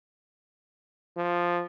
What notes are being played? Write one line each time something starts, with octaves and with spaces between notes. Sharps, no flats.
F3